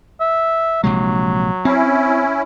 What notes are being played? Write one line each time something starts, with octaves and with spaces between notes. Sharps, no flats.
E5
A#1 C3 F#3 G#3
C4 C#4 E4